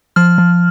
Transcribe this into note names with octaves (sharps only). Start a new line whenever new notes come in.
F3 F6
F3